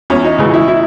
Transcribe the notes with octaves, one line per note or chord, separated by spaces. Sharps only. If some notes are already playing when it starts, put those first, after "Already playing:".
E2 C#4
D#4
C#3 E3 G#3
E4
E4